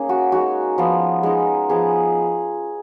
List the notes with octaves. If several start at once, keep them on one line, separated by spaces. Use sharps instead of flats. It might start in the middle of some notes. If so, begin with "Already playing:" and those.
Already playing: A#3 C#4 D#4 G#4
F#4
G#3 D#4 F#4
F3 B3 F4
G#3 D#4
F3 G#3 B3 G#4